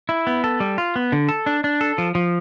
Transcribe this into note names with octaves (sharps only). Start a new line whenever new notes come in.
E4
B3
A4
G3
F4
B3
D3
A4
D4
D4
A4
F3
F3